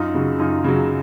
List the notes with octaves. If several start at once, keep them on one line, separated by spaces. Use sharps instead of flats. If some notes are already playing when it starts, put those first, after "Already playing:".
Already playing: F#2 D#4 F4
C#3 F#3
F#2 D#4 F4
C#3 F#3